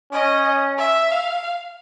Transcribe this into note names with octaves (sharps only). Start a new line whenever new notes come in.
C#4 D#5
E5
F5